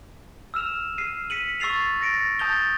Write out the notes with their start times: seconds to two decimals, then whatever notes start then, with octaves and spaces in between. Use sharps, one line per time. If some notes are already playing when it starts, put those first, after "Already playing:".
0.54 E6 F6 E7 F7
0.98 F6 C7 D#7
1.30 B6 C#7 D#7 F#7
1.60 C#6 E6 A6 C7 F7
2.01 A6 A#6 C#7 D7
2.39 A5 D#6 G6 A6 F7 G7